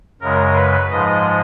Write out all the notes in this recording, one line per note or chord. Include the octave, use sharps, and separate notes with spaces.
F#2 C#3 G#3 A#4
B4
G#2 F3 G#3 D#5